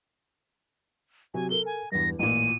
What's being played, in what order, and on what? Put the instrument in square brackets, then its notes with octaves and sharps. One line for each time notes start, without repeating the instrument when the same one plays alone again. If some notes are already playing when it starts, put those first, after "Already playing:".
[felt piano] C3 F#3 [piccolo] G#5
[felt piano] A4 A#4 [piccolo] G7
[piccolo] G#5
[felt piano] E2 G2 [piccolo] A#6
[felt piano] A1 A#2 [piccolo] D#7